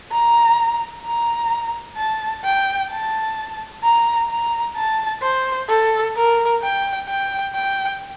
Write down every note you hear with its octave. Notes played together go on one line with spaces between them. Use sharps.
A#5
A#5
A5
G5
A5
A#5
A#5
A5
C5
A4
A#4
G5
G5
G5